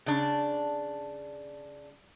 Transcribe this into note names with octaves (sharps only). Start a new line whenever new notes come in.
C#3 D4